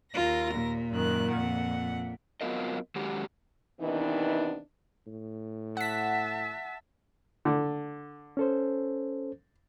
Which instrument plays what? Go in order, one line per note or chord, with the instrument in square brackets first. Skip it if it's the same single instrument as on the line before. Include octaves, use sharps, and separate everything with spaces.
[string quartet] D#2 A#4 A#6 [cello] F4
[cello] A#2
[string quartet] F#2 D#3 F#6
F2 F#5
[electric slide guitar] F#3 B3 C4 F4 A#4 D#5
D#3 G#3 C#4 F#4 G4
[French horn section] C3 D#3 E3 B3 D4 D#4
[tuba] A2
[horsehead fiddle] E5 A5 [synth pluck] F#5 B6
[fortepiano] D3
[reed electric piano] C#4 A4 C5